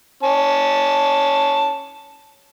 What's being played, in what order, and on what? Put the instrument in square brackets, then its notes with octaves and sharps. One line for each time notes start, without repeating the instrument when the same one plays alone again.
[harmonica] C#4 A5